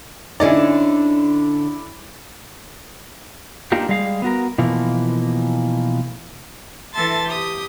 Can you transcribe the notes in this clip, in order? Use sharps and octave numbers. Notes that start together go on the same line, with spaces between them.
D3 C#4 D#4 E4 D5
A#3 D4 D#4 F4 G4
G3 G#3 G#4 F5
B3 F#4 A#4
B2 E3 F3 A#3
E3 A4 E5 A5 C6 A6
G4 D#6